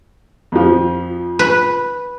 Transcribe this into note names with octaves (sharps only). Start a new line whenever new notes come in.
F2 F3
B4